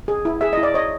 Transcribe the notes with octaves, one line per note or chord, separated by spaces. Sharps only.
G#4
E4
G#4 E5
E4 D#5
D5
C#5 D#5